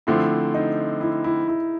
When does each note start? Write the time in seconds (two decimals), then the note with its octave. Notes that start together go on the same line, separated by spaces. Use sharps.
0.07 D3 F3 A3 C4 E4
0.54 D#4
1.01 E4
1.24 E4
1.48 E4